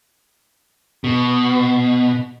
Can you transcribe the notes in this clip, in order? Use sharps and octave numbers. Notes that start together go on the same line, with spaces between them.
B2